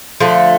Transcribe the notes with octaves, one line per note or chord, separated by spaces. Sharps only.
D3 F3 A3